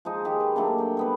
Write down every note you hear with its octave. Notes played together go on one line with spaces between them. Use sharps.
F3 G#3 D#4
D#3 G#3 G4
B4
F#3 A3 A#3 D4
F#3 G5
G3 B3 B4